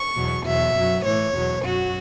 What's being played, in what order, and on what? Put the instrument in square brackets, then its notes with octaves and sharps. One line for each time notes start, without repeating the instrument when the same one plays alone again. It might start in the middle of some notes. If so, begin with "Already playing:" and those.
Already playing: [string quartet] C#6
E2 B2 F#3
E2 B2 F#3 E5
F#2 F#3
A2 E3 C#5
E2 B2 F#3
F#2 F#3 F#4